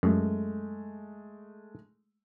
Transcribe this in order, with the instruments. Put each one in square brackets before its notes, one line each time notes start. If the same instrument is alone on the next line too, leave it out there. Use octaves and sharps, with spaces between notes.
[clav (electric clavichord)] F#2 [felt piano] G#3 A3